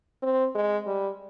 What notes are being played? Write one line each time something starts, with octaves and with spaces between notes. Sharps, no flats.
C4
G#3
G3